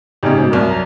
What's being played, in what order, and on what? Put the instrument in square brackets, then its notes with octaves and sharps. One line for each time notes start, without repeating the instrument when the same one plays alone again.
[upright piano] A1 C#3 [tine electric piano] C#4 D#4 G4
[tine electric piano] G#2 B2
[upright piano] C2 F#2 F#3 [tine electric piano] A#4
[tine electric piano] A#5